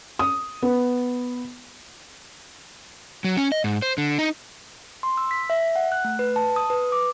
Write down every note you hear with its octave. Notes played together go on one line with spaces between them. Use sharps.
D#6
B3
F#3
C#4
D#5
G#2
C5
D3
D#4
C6
E6
B6
E5
F#5
F#6
A3
B4
A5
D#6
B4
D6